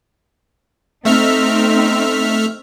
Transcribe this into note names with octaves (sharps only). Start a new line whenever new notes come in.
A3 C4 D#4 E5 F6